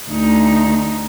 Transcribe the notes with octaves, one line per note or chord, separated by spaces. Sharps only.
D2 D#4